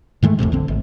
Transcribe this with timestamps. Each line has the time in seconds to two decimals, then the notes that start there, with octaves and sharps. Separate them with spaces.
0.23 G#2 D#3 G#3 A3
0.39 F#1 E2 A2 C3
0.52 B1 D3 C4
0.68 G#1